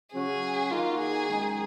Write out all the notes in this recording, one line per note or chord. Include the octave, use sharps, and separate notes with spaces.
C#3 F#3 C#4 F#4 G#4
D#3 A#3 D#4 F4 F#4
G#4
F#2 D#3 G#3 D#4